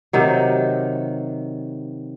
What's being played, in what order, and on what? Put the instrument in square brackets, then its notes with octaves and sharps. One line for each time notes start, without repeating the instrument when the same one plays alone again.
[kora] C3 D#3 F#3